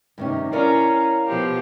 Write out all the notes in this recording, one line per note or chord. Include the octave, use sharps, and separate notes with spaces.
G2 C3 D#3 C#4
C#4 E4 A#4 C#5 D5 F5 A#5
B2 F3 G4